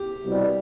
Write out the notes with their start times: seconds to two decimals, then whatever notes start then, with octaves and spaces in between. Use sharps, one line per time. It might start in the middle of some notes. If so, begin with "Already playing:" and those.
Already playing: G4
0.26 C2 B2 G3